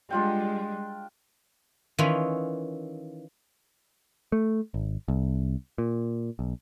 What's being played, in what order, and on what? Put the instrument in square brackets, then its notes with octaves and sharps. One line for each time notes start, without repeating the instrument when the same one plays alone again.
[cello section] G3 G#3 [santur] D4 F4 G5
[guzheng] D#3 E3 C#4 F4 B5
[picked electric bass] A3
G#1
C2
A#2
B1